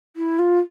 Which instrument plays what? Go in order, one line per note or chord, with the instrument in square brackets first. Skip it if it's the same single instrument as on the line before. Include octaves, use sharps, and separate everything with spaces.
[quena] E4
F4